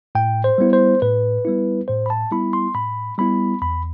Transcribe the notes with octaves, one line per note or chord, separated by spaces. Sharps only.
A2 G5
C5
G3 B3 E4
C5
A2 B4
G3 B3 E4
A2 C5
B5
A5
G3 B3 E4 B5
C6
A2 B5
G3 B3 E4 B5
E2 B5